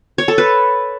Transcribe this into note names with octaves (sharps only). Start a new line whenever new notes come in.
C#5
A4
B4